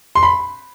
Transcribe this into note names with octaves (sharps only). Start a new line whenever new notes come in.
C6
B5